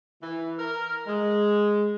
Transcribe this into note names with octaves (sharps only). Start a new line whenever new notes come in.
E3
A#4
G#3